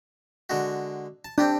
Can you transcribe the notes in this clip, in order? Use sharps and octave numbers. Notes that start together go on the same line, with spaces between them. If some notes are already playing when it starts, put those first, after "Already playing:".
D3 G#3 F#4
A5
C4 D4 G4 D#6